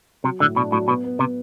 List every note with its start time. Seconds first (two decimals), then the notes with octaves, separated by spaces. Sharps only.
0.24 C3 F#3
0.40 A2 D3
0.56 B2 D4
0.72 A2 F#3
0.88 B2 B3
1.04 B3
1.19 C3 B3